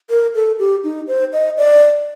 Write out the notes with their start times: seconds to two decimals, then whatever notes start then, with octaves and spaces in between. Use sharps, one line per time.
0.10 A#4
0.35 A4
0.59 G4
0.84 D#4
1.08 C5
1.33 D#5
1.57 D5